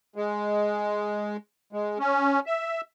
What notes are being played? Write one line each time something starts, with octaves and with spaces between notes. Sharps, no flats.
G#3
G#3
C#4
E5